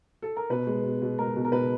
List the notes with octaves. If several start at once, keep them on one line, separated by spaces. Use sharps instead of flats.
A4
A#4
B2 B4
G#3
B2
B2
G#3 A#4
B2
A#4
B2 B4